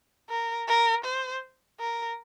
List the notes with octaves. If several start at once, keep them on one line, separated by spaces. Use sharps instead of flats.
A#4
A#4
C5
A#4